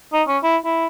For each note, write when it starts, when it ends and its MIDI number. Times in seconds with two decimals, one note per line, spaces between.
0.13 0.22 63
0.28 0.38 61
0.43 0.57 64
0.65 0.87 64